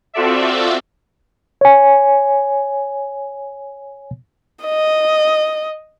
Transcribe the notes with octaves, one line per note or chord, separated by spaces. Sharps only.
C4 F4 F#4 A4 D5 E5
C#5 G#5
D#5